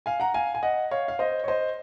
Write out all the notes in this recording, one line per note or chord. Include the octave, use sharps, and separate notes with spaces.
F5 G#5
F#5 A#5
F5 G#5
G#5
D#5 F#5
C#5 F5
F5
C5 D#5
C#5
C5 D#5